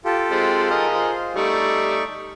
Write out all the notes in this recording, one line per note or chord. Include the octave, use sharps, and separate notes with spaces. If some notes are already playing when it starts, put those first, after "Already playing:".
F4 G4 A4
G#3 C4
G#4 A#4 D#5
F4 C5
G3 A3 D#4 D5 C#6